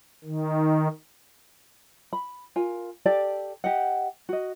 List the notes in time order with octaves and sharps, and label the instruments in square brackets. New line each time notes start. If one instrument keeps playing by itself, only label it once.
[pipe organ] D#3
[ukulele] B5
F4 A#4 G#5
G4 A4 D5 A5
G4 D#5 F#5
F#4 D#5